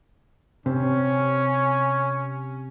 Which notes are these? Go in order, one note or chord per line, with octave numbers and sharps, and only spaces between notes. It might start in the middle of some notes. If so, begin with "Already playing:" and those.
C3 C#4